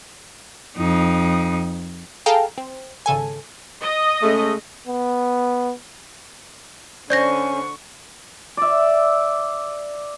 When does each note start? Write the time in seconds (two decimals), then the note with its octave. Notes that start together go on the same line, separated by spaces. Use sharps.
0.78 F2 D#4
2.26 G#4 A4 F5 G5 A5 A#5
2.58 C4
3.06 G#1 C#3 A4 G#5
3.82 D#5
4.22 C#3 G#3 A3
4.87 B3
7.10 D3 C#4 C5 D5 C#6 G6 A#6
8.57 D5 E5